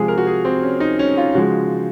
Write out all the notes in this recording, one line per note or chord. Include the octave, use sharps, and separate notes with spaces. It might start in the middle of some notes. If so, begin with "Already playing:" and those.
Already playing: C3 F3 G#3 G#4
A#4
F#4
G#4
C4
C#4
D#4
C#4
F4
C#3 F3 G#3 F#4